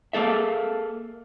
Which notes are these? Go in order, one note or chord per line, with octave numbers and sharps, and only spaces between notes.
A#3 G#4 A4 E5